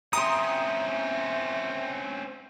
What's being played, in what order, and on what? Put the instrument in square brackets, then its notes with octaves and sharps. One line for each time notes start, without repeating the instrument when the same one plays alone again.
[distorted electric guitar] C4 C#4 [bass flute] E5 [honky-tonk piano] A#5 C6 [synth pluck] D#6